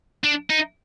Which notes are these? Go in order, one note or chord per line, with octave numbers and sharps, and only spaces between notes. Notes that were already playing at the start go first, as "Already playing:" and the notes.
D4
D#4